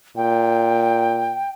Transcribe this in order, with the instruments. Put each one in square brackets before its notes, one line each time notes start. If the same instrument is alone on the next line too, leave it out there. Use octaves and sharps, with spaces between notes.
[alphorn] A#2 [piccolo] G5